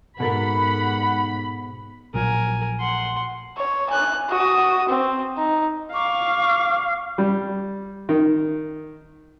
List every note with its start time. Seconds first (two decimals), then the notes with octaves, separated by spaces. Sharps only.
0.20 G#2 B2 A4 A#4 F#5 B5
2.14 A#1 A#2 F#3 A#4 G#5
2.80 F#5 C6
3.58 C#5
3.90 G#5 F#6
4.29 F#4 D#6
4.89 C4
5.37 D#4
5.93 F5 C#6 D6
7.18 G3
8.09 D#3